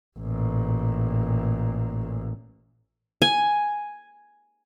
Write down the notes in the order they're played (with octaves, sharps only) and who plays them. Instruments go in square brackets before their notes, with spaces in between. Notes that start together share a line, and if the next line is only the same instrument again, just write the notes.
[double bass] A1 A#2
[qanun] G#5